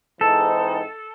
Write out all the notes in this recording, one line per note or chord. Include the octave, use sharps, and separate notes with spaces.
G#2 E3 G#3 C4 D#4 A4